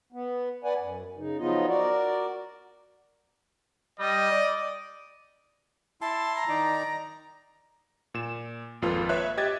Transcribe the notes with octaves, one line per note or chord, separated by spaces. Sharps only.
B3
B4 D5 F#5 G#5
F#2
C#3 D#4
F3 F#3 B3 D#4 F4 D#5
F#4 A#4 D5
G3 D#5
D5
E4 A5 C6
A#5
D#3 D#4 D5
A#2 E7
G#1 F2 A#3 F4 A4 B4
B4 C#5 E5 F#6
G4 D#5 E5 G#6 A6